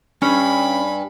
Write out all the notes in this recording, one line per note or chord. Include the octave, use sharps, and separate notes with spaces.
G2 C#4 G#5 B5